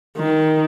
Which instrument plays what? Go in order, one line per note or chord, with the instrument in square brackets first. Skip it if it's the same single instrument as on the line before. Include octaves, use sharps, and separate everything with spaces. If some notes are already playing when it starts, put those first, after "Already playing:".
[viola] D#3